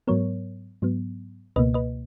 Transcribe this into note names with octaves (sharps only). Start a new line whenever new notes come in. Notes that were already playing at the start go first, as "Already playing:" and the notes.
G#2 F#3 B3 A#4 C#5
G#2 F#3 B3
C#2 B2 A#3 B4 D#5
B4 D#5